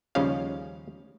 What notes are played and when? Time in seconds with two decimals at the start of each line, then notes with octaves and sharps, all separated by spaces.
0.15 D#2 C#3 F3 G3 C#4 F5